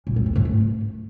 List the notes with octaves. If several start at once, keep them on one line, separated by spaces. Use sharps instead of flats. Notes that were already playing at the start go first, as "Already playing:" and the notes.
A#2
B3
C4
G#2
A3